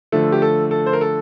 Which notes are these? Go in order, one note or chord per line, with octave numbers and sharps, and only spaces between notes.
D3 F3 A3 A4
G4
A4
A4
C5
A#4
A4